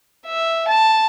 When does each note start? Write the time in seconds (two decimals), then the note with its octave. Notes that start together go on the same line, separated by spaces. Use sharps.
0.26 E5
0.68 A5